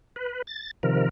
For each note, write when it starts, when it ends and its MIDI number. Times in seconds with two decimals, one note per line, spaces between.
0.16 0.42 71
0.47 0.71 93
0.83 1.09 48
0.83 1.09 51
0.83 1.09 53
0.83 1.09 70